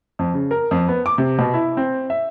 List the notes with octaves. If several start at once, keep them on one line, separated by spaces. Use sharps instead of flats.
F2
C#3
A#4
F2
B3
D6
C3
B2
E4
C4
E5